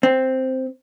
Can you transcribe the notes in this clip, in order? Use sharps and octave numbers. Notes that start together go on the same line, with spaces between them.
C4